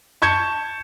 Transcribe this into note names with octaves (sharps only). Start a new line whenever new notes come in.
A5 C#6 G6 G#6 C#7 E7